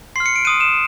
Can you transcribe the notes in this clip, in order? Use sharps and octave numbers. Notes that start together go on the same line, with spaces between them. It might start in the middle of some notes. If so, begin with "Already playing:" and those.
C6 F6 C7
C#7
D7
C6 D#6 F#6 D#7
E7